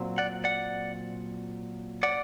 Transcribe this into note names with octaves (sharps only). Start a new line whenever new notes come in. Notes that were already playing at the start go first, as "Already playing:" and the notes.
Already playing: A#2 F#3 C4
D5 F#5
D5 F#5
D5 F#5